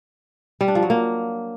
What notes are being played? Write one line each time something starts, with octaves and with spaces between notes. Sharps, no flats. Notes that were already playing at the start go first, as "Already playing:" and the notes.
G3
D4
F3
F#3
A#3